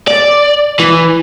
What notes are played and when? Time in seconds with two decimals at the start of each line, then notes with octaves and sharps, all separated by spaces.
0.08 D5
0.79 E3